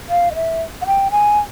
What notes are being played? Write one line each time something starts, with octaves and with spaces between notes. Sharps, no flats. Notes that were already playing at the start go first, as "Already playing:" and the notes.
F5
D#5
E5
F#5
G5
G#5